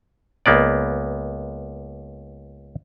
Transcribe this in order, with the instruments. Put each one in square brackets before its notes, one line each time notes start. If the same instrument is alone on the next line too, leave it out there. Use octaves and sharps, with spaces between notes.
[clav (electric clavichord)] C#2 A#3 B3 D5